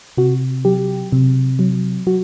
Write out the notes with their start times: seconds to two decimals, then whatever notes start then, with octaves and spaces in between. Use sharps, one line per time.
0.17 C3 F#4
0.65 F#3 G4
1.12 C3
1.59 F#3
2.07 F#3 F#4